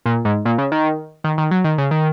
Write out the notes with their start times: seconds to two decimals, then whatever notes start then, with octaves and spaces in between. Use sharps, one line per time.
0.06 A#2
0.25 G#2
0.45 A#2
0.58 C#3
0.72 D#3
1.24 D#3
1.38 D#3
1.51 F#3
1.64 D#3
1.78 C#3
1.91 D#3